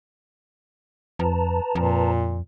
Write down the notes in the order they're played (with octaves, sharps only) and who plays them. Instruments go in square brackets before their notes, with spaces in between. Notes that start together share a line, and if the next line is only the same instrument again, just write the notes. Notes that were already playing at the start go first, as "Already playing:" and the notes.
[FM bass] F2 [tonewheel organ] B4 A5 A#5
[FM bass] F2 [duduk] A#2